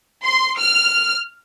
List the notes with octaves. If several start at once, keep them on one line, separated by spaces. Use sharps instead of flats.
C6
F6